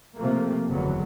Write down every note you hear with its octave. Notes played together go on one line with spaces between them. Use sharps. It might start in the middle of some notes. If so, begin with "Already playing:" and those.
C3 F3 A3 A#3
F#1 E2 D3 F#3 A3 B3